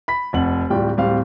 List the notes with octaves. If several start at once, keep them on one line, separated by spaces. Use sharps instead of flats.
B5 B6
F1 F2 F#5 F#7
D1 G3 F4 D5 G5
D1 G3 C4 F5